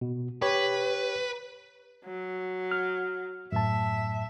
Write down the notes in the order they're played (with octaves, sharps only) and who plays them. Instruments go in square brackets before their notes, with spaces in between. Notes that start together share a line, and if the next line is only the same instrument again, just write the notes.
[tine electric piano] B2
[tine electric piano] G4 C#5 [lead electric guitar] B4
[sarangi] F#3
[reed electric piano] F6
[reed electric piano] F#2 A2 A5 [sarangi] E5